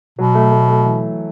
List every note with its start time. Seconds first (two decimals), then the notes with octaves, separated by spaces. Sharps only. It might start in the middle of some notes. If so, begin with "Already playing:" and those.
0.19 B2 F#3
0.35 A3
0.51 A3
0.68 A3
0.85 E3